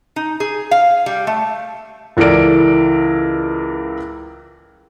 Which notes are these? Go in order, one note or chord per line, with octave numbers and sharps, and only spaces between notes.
D#4
G#4
F5
G3
A3
C#2 E3 A4 A#4 D5 D7